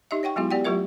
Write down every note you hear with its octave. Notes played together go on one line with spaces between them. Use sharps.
D#4 G4 D#5 E5
C#5 F#5 G5 C#6
F#3 G#3 B3 E4 F#4 G#4
B3 G4 D5 F#5 G5
F#3 A3 F4 G4 A#4 E5